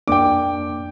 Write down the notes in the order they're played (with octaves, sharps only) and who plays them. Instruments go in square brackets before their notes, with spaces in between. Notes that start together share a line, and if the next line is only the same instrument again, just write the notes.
[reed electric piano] F2 A#3 D4 [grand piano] G5 D6